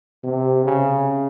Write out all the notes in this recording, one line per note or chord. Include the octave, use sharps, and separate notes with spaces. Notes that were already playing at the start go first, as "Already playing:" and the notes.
C3
C#3